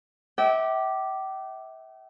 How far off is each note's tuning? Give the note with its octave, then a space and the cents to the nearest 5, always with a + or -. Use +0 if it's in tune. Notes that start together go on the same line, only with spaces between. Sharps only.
E5 -30 G5 -40 D6 +5